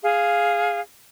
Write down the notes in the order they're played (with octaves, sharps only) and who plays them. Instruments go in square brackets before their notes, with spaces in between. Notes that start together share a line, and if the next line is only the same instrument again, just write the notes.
[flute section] G#4 F5